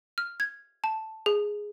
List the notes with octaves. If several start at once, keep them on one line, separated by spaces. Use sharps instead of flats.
F6
G#6
A5
G#4